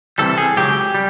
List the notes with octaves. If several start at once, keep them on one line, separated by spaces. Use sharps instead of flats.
C2 C3 E3 G3 A4
G#4
C#2 C#3 F#3 G4
G3